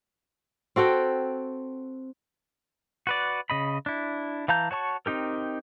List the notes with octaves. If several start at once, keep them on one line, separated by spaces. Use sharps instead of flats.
C4 F#4 A4 G5
F#4 B4 D5
C#3 D#5 B5
D4 E4
E3 F5 A5 A#5 G6
F#4 C#5 A5 C#6
C4 D#4 G4 A#4